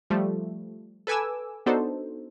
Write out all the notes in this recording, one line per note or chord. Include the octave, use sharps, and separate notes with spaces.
F3 G3 A3
A4 B4 G#5 D6 E6
B3 D4 D#4 F#4 A4 C5